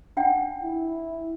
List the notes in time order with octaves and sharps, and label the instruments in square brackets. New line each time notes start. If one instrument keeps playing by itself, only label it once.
[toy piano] D4 F#5 G5
[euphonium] E4